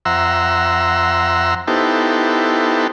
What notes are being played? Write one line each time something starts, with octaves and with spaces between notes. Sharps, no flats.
F2 E5 F#5 A#5 C6 E6
B3 D#4 E4 G4 A4 C5